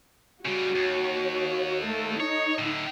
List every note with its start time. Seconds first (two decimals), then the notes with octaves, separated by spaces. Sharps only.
0.45 C#3 G3 F#4 C#5
0.75 D#2
1.84 A3 A4
2.20 D#4 C#5
2.58 A2 D3